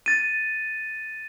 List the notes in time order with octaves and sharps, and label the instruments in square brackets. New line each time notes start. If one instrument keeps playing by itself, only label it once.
[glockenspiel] A6 D#7